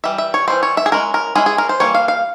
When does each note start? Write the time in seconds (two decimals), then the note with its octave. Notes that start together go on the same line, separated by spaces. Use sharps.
0.04 E3 G3 E5
0.18 E5
0.34 C#5
0.48 E3 G3 A#3 E4 C5
0.63 C#5
0.77 E5
0.86 G#4
0.92 G#3 C#4 E4 A#4
1.14 A#4
1.35 G#3 C#4 E4 G#4
1.46 G#4
1.58 A#4
1.69 C5
1.80 E3 G3 A#3 C#5
1.95 F5
2.08 F5